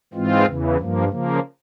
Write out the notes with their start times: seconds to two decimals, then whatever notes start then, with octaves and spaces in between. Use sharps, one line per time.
0.14 G#2 E3 G#3 C4 F4
0.46 E2 C#3 E3
0.77 G2 F3 A#3
1.08 C#3 F3 A#3